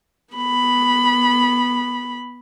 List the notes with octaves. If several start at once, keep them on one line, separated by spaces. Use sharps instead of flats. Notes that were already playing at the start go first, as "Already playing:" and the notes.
B3 B5